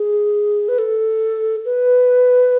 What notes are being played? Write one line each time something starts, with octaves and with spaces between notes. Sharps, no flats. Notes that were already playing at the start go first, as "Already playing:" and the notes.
Already playing: G#4
B4
A4
B4